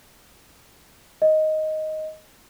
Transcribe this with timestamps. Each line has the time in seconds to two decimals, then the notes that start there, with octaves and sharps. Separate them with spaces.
1.22 D#5